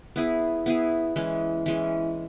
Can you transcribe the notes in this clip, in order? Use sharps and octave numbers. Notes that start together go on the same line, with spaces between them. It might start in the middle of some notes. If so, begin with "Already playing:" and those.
B3 E4 G#4
B3 E4 G#4
E3 G#3 C#4
E3 G#3 C#4